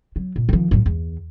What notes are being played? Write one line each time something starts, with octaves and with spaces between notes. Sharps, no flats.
F#3
A#2
D#3 F3
F#2 A2
E2